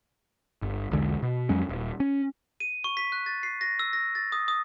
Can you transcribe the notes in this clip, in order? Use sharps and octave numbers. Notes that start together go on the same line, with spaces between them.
G1
B1 E2 D3 G#3
B2
F2 F#3 G#3 C#4
D#1
C#4
D#7
C#6
B6
F#6
A6
C7
A#6
E6
A#6
A6
D#6
D#6